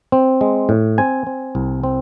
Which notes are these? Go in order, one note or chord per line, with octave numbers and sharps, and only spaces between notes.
C4
G#3
A2
C4 G#5
C4
C2
C4